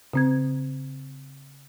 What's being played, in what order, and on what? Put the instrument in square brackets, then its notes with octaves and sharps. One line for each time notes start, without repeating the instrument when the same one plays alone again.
[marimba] C#3 C4 G#6